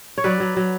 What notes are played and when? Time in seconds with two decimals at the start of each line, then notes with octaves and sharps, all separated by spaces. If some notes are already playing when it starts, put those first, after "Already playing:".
0.18 C#5
0.24 F#3 B4 D5
0.40 F#3
0.56 F#3